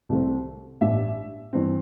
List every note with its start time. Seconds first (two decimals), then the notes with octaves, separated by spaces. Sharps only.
0.09 C2 C3 A3 C4
0.81 A1 G2 G3 D4 E5
1.53 G2 E3 C4